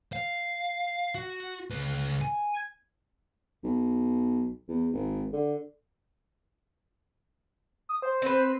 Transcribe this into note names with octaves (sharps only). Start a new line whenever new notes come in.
F5
F#4
C#2 B4
G#5
B1
E2
G#1
D3
D#6
C5
C4 B4